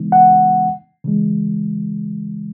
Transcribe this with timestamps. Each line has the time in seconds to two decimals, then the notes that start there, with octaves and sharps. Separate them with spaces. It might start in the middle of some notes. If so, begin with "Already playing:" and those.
Already playing: C#3 E3 G#3 B3 D#4
0.12 F#5
1.04 C#3 E3 G#3